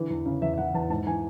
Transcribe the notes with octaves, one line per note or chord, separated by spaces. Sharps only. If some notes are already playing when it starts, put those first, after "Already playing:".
Already playing: D3 E3
E2
C#3
E2 E5
E5
E3 F#5
E2 A5
G#2 A5
E3 G#5